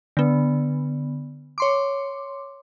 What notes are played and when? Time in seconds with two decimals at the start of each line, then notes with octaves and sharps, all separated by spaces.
0.17 D3 B3
1.58 C#5 C6 D6